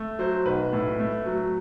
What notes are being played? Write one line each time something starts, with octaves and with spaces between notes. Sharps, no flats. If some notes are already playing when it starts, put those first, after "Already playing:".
Already playing: A3
F#3 C5
B1 B4
A2
A3
F#3